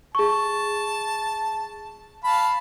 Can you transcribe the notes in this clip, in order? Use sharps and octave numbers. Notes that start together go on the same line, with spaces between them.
G#4 A5 C#6
F5 A5 B5